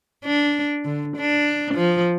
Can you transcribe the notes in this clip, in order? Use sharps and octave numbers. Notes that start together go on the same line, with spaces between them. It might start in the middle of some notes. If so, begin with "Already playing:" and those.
D4
D3
D4
F3